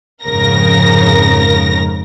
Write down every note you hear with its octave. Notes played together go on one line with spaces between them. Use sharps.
F2 G#2 C#3 A#4 A#6